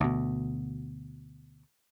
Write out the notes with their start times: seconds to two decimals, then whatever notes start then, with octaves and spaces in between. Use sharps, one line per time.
0.01 D2 B2